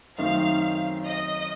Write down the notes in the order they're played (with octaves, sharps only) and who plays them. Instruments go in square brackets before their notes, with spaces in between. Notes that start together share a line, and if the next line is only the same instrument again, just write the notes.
[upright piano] F#2 D#3 A3 C4 D#4 [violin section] F5
[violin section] D#5